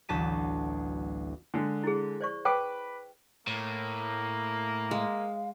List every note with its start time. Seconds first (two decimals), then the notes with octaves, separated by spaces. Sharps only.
0.09 A1 D2 F#3 A5 B6 D#7
1.54 D3 G#3
1.84 E4 G#4
2.21 C5 D5 C#6
2.45 B4 G5 D6
3.47 A2 A#3
4.91 G#3 F5